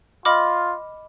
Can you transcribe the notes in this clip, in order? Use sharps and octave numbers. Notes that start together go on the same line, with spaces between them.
F4 D#5 B5 D6 F6